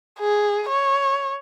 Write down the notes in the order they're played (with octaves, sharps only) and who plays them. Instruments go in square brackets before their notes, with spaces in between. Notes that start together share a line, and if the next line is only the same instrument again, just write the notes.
[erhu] G#4
C#5